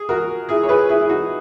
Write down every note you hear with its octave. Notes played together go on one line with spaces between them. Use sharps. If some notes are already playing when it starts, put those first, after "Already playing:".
Already playing: G#4
F#4 A#4
E4 G#4
C#5
G#4 B4
E4 G#4
E4
D#4 F#4